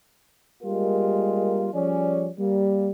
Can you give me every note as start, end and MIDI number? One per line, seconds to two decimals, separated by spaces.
0.63 1.69 55
0.63 1.69 56
0.63 1.69 58
0.63 1.69 65
0.63 1.69 67
0.63 1.69 70
1.74 2.29 53
1.74 2.29 55
1.74 2.29 61
1.74 2.29 68
1.74 2.29 73
1.74 2.29 74
2.38 2.92 55
2.38 2.92 58